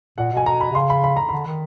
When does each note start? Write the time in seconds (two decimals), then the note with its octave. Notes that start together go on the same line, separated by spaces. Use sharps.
0.18 A#2 F#5
0.32 B2 G#5
0.46 B2 A#5
0.61 B5
0.71 C3
0.75 C#3 C6
0.90 B5
1.04 B5
1.17 A#5
1.29 D3 B5
1.47 D#3